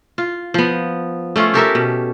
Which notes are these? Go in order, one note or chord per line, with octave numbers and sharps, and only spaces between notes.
F4
F3 B3
A3 C#4 F4
G4 A4 A#4 E5
B2